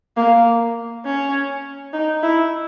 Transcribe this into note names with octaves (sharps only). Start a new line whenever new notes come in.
A#3
C#4
D#4
E4